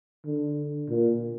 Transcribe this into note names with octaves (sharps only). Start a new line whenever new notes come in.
D3
A#2